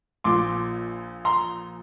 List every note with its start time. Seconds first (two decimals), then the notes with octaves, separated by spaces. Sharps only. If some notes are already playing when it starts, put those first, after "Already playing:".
0.24 A#1 A#2 F3 C6 D6
1.25 A#5 C6